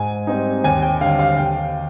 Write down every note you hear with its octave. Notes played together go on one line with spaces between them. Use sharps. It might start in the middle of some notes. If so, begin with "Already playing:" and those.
Already playing: G#2 G#5
G3 C4 D#4
D#2 G#5
G5
D3 G3 F5
F5
D#2 G5